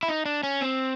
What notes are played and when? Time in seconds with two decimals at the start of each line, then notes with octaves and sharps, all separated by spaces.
0.03 E4
0.08 D#4
0.26 D4
0.43 C#4
0.61 C4